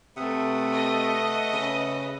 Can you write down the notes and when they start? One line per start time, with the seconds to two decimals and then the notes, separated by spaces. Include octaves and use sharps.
0.16 C3 A3 B4 E5 F#5 D#6
0.74 D#5
1.53 C#3 B4